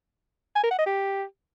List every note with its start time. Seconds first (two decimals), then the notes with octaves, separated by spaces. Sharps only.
0.56 G#5
0.63 A#4
0.71 F#5
0.79 D#5
0.86 G4